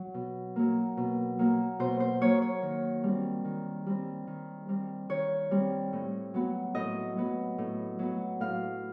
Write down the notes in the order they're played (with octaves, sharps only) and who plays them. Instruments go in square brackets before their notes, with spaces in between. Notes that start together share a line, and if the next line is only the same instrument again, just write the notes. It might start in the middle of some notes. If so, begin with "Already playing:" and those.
Already playing: [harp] F#3
B2
F#3 A#3
B2
F#3 A#3
B2 C5
C5
F#3 A#3 C#5
C#5
D#3
G3 C4
D#3
G3 C4
D#3
G3 C4
D#3 C#5
G3 C4
A2
F#3 B3
A2 D#5
F#3 B3
A2
F#3 B3
A2 F5